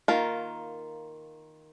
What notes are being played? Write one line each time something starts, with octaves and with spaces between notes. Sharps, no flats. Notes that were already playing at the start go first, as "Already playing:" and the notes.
D#3 A#3 F4 A#4